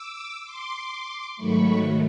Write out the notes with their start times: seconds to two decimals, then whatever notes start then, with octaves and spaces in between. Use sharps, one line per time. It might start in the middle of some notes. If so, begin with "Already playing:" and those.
Already playing: D6 E6
0.43 C6 D6
1.37 G#2 D#3 F#3 A3 B5 C#6